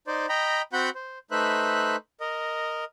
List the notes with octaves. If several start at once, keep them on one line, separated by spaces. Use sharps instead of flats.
D#4 C5 D5
D#5 G5 A#5 B5
C4 F#4 F#5 B5 G6
C5
A3 D#4 B4 C5 E5 F#6
A#4 D#5